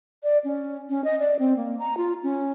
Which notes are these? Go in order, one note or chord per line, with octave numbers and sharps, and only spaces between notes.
D5
C#4
C#4
D#5
D5
C4
A#3
A#5
F4
C#4